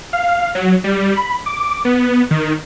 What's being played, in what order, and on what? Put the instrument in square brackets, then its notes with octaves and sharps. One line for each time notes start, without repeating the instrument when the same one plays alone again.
[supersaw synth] F5
F#3
G3
B5
D6
B3
D#3